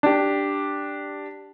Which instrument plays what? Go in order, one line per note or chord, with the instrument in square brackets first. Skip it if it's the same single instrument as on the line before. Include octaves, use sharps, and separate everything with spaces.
[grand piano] D4 G4